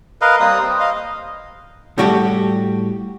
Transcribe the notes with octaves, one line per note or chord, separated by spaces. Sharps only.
A#4 B4 D#5 F5
G3 A#3 C4 D#6
C5
D#5 F5
A2 G3 F#4 G4 A4